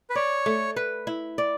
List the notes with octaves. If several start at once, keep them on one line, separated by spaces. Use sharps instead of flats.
B4
C#5 D5
A3
B4
E4
D5